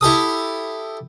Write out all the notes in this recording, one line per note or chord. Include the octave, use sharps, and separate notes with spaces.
E4 G4 A4 D#6